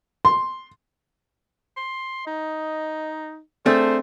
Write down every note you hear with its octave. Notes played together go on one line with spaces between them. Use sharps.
C6
C6
D#4 D#5
A3 C4 D4 G#4 C5